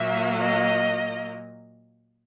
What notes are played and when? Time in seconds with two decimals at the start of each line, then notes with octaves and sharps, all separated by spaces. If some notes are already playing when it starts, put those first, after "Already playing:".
Already playing: A#2 F#3 A#3 E5
0.39 D#5